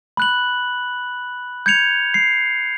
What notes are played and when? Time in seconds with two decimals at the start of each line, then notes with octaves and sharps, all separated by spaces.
0.17 B5 F#6 F#7
1.66 G6 G#6 C#7 F7
2.14 C7